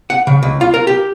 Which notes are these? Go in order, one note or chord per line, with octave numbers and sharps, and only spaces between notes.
F#5
C#3
C#2
F4
A#4
G4